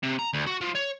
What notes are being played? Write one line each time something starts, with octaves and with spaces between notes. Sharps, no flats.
C3
A#5
D2
F#4
F3
C#5